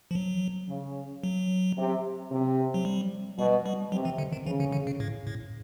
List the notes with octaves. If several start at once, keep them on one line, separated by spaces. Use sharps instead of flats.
F3
F#3
C#3
F#3
C3
C3
F#3
G3
B2 G3
G3
C3 F#3
E3
D3
D#3
C#3 E3
D3
D3
C#3
A2
A2